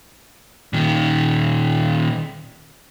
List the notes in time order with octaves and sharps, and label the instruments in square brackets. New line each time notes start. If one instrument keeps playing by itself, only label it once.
[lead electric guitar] A#2 D#3